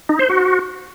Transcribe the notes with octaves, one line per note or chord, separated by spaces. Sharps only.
D#4
C5
F#4